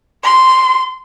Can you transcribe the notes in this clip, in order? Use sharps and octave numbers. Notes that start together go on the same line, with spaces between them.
C6